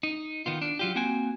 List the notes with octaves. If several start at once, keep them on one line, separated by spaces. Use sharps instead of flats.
D#4
D#3 B3 F4
D4
F#3 F4 G4
A#3 C4 F#4 G5 G#5